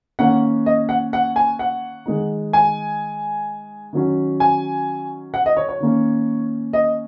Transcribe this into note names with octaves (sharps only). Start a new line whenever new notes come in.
D#3 A#3 C#4 F#5
D#5
F#5
F#5
G#5
F#5
D#3 G#3 D#4
G#5
D#3 F#3 C#4
G#5
F#5
D#5
C#5
C#5
D#3 A#3 C#4
D#5